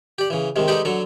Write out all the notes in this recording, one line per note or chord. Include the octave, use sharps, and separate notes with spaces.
G4 D5
C#3 E3
C3 D#3 G#3
G#3 D#4 G4 A4 B4 D5
D3 F#3 A4